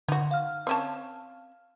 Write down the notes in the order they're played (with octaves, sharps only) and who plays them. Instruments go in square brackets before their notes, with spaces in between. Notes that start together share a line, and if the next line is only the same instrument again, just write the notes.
[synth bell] D3 [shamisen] D#4 F#4
[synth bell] F5 F6
[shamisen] C4 C#4 A5